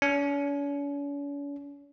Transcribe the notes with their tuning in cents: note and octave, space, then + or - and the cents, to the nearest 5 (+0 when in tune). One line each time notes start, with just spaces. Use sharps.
C#4 +45